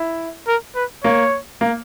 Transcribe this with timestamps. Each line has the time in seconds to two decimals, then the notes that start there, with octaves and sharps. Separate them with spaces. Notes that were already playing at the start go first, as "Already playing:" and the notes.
Already playing: E4
0.48 A#4
0.76 B4
1.04 A#3 C#5
1.61 A#3